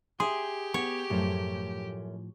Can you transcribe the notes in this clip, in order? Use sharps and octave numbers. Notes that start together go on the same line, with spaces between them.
G4 G#4 E5 C6
B3 C#5
F#2 A2 F3 A3